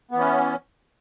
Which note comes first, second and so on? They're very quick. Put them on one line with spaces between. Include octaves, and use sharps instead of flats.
B3 E3 C#4